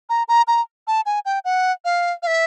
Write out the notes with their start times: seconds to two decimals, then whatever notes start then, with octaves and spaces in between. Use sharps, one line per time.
0.10 A#5
0.28 A#5
0.48 A#5
0.87 A5
1.06 G#5
1.25 G5
1.45 F#5
1.85 F5
2.23 F5
2.27 E5